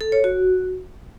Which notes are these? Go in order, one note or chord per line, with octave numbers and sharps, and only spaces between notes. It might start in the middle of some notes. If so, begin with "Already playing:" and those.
A4
C#5
F#4